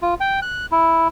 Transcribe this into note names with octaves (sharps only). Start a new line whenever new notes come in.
F4
G5
F#6
E4